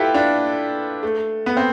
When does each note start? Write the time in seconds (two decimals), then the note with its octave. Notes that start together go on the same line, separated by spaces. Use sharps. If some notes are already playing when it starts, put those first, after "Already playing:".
Already playing: E4 F4 G4 A4 B4
0.14 D4 F4
1.03 A3
1.46 B3
1.57 C4